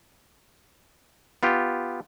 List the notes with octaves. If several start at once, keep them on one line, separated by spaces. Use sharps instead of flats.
B3 F4 G4